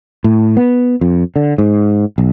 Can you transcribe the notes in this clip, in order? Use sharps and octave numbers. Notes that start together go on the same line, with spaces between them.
A2
B3
F2
D3
G#2
B1